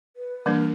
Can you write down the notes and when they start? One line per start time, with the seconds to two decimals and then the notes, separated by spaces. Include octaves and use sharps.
0.17 B4
0.46 E3 G3 A#3 D4 A#4